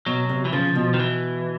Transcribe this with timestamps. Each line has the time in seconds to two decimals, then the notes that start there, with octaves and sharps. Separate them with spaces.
0.06 B2 F#3
0.29 C3
0.45 E3
0.53 C#3 F3
0.75 B2
0.94 D#3
0.99 E3